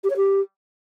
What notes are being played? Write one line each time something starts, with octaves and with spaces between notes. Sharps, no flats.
G4
C#5
G4